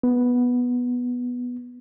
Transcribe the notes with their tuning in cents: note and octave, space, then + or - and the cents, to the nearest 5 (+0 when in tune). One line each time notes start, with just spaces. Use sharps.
B3 -5